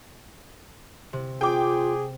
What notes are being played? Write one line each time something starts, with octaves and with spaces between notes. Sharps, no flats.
C3
F4 G#4 G5 D6